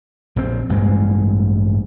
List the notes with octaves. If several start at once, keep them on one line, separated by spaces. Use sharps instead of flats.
A#1 F3 C4
A1 G2 G#3 A#3